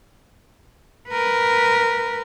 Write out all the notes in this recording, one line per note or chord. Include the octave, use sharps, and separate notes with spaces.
A#4 B4